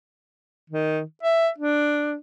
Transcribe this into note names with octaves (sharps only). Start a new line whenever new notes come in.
D#3
E5
D4